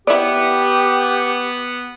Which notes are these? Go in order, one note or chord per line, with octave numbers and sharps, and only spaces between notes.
B3 E4 G4 D5